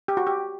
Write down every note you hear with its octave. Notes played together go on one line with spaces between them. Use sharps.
G4
F#4
G4